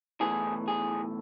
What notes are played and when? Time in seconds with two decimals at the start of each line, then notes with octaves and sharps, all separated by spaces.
0.21 B1 A2 E3 G#4
0.68 G#4